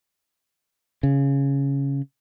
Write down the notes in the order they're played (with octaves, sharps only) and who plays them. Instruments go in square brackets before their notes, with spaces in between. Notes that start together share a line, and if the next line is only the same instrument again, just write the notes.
[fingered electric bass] C#3